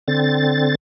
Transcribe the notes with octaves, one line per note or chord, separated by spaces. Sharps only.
D3 C4 A6